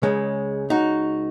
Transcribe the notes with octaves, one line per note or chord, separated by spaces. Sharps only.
C#2 C#3 G#3
D#4 F#4